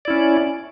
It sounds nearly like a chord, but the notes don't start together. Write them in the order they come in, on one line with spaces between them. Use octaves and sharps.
D5 E4 C#4